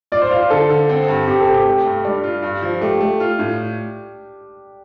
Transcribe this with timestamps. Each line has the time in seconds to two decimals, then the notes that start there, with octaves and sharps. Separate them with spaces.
0.12 F4 D5
0.22 C5
0.31 F4 F5
0.41 C5
0.50 D3 A4
0.70 D3
0.89 C4
1.08 G2
1.27 C4 G4
1.41 A4
1.47 C3
1.54 G4
1.66 A3
1.85 G2
2.05 G3 D4
2.24 F4
2.42 G2
2.62 F3
2.81 A3 G4
3.00 A3
3.20 F4
3.39 A2